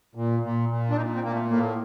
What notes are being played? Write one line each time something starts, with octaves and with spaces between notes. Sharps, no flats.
A#2
A#2
A#2
D4
A#2 D#4
C4
A#2 A#3
A3
A2 A#3